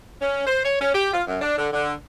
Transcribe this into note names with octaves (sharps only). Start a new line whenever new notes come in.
C#4
C5
C#5
C#4
G4
F4
F#2
D4
D3
D3